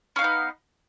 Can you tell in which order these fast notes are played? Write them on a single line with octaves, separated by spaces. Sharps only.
C#4 F5 D#4 B3